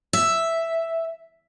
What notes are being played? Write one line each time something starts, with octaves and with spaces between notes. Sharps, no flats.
E5